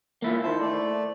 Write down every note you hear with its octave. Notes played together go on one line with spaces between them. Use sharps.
A#3 E4 F4
D#3 E4 C5 A5
A3 A4 D5